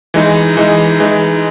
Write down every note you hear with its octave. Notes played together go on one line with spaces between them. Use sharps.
E3 G#3 D#4
E3 G#3 D#4
E3 G#3 D#4